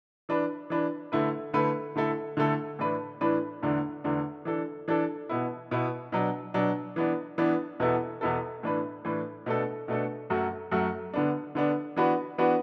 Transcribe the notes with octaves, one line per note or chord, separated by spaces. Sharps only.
E3 D4 B4
E3 D4 B4
D3 A3 E4 B4
D3 A3 E4 B4
D3 A3 E4 A4
D3 A3 E4 A4
A2 E3 D4 B4
A2 E3 D4 B4
E2 D3 A3 D4
E2 D3 A3 D4
E3 D4 A4
E3 D4 A4
B2 B3 E4
B2 B3 E4
B2 F#3 D4
B2 F#3 D4
E3 B3 D4
E3 B3 D4
E2 B2 B3 E4 A4
E2 B2 B3 E4 A4
A2 E3 D4 B4
A2 E3 D4 B4
B2 A3 D4 A4
B2 A3 D4 A4
F#2 F#3 A3 F#4
F#2 F#3 A3 F#4
D3 B3 D4
D3 B3 D4
E3 B3 D4 F#4 B4
E3 B3 D4 F#4 B4